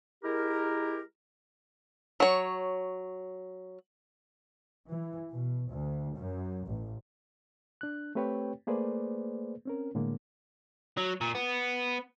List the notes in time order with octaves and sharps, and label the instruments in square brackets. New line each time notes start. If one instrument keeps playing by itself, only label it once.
[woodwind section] G#3 E4 G4 A#4
[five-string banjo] F#3 C#5
[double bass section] E3
B2
D2
F#2
A1
[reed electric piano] D4 F#6
A3 C4 G4 B4 C#5 G5
A3 A#3 G#4 B4 C5 D5
C4 C#4 A#4
A2 D3 G#3 A#3
[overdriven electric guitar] F#3
A#2
B3